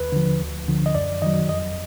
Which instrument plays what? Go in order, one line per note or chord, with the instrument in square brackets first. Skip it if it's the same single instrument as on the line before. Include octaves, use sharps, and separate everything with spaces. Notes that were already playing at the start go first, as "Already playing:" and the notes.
Already playing: [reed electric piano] D#2 B4
D3 F3
D2
D3 F3
D#5
F#2 D5
D#3 D#5
F#3
F2 D#5